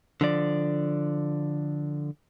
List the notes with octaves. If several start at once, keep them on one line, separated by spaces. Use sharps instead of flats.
D3 F3 D5